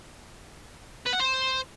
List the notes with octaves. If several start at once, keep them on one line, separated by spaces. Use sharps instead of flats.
B4
F#5
C5